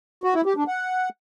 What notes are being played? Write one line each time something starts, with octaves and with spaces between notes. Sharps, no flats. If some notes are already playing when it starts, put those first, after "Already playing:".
F#4
E4
G4
D4
F#5